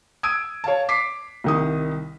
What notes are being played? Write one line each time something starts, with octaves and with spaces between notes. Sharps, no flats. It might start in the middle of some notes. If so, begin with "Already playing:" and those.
D#6 E6 G#6 D7 D#7
C#5 F5 A5
D6 B6 C7
C2 D#3 D#6